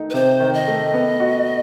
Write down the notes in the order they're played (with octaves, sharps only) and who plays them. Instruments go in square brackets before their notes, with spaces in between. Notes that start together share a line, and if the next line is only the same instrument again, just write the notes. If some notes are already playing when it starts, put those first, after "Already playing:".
Already playing: [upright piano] D#3 A3 D#4
[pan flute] B4
[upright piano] C3 [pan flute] C5
[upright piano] D#3
[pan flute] D#5
[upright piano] A3
B3
F#4